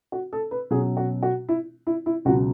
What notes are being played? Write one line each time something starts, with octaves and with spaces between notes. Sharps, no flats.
F#4
A4
B4
B2 F#3 C#4 G#4
F#4
F#4
E4
E4
E4
C#2 B2 F#3 F#4